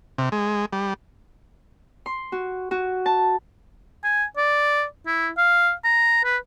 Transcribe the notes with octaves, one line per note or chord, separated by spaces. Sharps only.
C3
G#3
G3
C6
F#4
F#4
A5
G#5
D5
E4
F5
A#5
B4